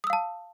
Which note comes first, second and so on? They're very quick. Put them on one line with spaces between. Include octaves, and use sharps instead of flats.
D#6 E6 F5 A5